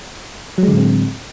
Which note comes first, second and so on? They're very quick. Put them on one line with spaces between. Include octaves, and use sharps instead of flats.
F#3 G#3 D3 A2 C4